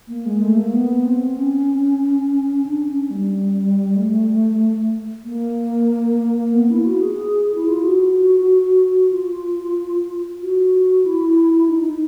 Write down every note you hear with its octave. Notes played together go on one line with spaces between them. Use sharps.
A#3
G#3
A3
A#3
B3
C4
C#4
D4
C#4
G3
A3
A#3
B3
E4
F#4
G#4
E4
F4
F#4
F4
F#4
E4
D#4
D#4